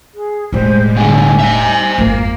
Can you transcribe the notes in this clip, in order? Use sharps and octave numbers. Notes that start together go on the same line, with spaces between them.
G#4
E1 A2 G3 G#3 C5
B2 D3 G#5
G3 D#4 C5 E5
G#1 F2 A#3